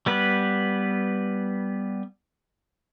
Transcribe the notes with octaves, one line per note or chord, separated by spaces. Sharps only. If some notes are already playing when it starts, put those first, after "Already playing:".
G3 B3 B4